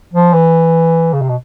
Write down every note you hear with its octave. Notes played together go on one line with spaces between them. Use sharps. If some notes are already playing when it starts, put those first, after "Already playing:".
F3
E3
C#3
C3
B2